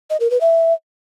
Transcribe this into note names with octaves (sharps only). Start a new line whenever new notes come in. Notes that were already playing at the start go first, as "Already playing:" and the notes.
D#5
A#4
B4
E5